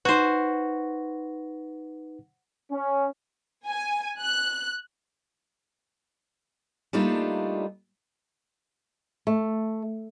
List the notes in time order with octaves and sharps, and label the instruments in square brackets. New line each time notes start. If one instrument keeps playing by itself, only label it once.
[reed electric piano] D#4 B4 [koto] F#4 C5
[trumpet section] C#4
[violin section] G#5
F#6
[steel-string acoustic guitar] G3 A3 A#3 D4 D#4 F4
[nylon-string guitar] A3